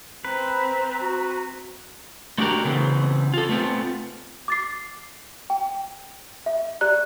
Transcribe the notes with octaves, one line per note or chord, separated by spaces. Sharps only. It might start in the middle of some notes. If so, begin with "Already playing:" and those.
C4 B4 A#5
F#4
A3 D4 F#4 G4 A#4
C#3 E3 B3 C4
F4 A4
A3 B3 C4 F4
D6 A6 C7
G5
E5
G4 D5 A#5 F#6